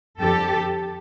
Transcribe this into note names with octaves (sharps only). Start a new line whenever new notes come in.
F2 D3 F3 G4 A4